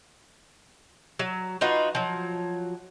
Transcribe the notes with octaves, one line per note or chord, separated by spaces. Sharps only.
F#3
D#4 F4 F#4 B4
F3 F#3